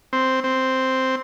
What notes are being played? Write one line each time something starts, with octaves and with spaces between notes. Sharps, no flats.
C4
C4